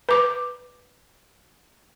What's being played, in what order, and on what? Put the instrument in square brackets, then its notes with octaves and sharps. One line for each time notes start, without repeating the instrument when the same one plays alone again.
[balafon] B4 D6